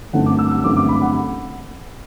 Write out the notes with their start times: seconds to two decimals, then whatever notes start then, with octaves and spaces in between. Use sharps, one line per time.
0.13 G1 F#2 D3 A3 C4 F#5
0.26 D6
0.39 E6
0.51 E6
0.64 G1 F#2 D3 A3 C4 D6
0.76 D6
0.89 B5
1.02 F#5